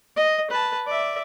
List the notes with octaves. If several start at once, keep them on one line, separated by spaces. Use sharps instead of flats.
D#5
B4 A5
D5 E5